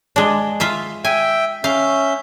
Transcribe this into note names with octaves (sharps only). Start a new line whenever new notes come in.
G#3 D4
F4 E5 F5
E5 G5 G#5
C#4 E5 F5 G6